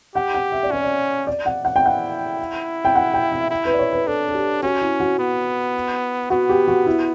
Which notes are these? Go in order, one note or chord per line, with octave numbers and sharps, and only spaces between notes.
G4 F#5
F#5
E5
D5
C#4 C#5
D5
D5
F#5
F#5
G5
E4 F#5
G5
F#5
G5
E5
E4
B4
D5
C#5
B4
D4 A4
A4
G4
C#4 F#4
E4
F#4
B3
B3 F#4
G4
F#4
E4